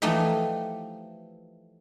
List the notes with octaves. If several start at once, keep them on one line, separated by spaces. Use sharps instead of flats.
E3 F3 A3 D#4 G4 E5